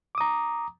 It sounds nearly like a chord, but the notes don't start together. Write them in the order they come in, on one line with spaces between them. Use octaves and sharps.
D6 D#6 A#5